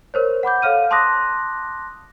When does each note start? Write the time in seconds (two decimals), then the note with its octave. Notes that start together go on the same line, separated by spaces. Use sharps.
0.14 A#4 C5 C#5
0.43 F#5 B5 D6 G6
0.62 A4 C#5 F5 F6 D#7
0.91 A5 C6 D6 D#6 F#6 A#6